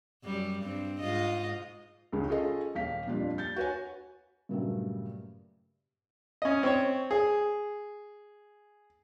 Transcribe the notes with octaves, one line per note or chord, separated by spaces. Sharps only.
F#2 G3
G2 C4
G#2 F4 D#5
C#2 C#3
C#4 F4 G#4 A4 D#5
D#1 F5 B6
F2 A#2 G3 D4 F4
G6 A6
F#4 B4 C#5 G#5
G2 A#2 C#3 F#3 G3 A3
C#4 D#5
C4 C#5
G#4